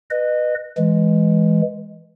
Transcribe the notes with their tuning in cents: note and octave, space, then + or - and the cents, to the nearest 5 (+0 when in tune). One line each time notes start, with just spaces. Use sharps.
B4 +0 D#5 -25
E3 +0 G#3 +0